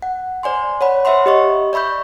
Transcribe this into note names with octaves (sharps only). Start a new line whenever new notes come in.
F#5
C5 D5 G#5 C6
C#5 F#5 B5
C5 C#5 E5 F#5 B5 C6
G4 D#5 C#6
D5 E5 B5 C#6 G6